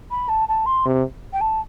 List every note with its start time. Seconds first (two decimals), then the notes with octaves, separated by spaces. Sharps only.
0.11 B5
0.29 A5
0.49 A5
0.66 C6
0.86 C3
1.33 G5
1.41 A5